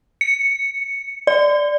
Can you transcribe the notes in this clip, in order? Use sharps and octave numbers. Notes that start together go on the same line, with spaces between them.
C#7
D5